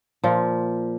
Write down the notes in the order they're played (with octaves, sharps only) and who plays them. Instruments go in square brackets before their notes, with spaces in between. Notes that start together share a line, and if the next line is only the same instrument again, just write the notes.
[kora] A#2 F3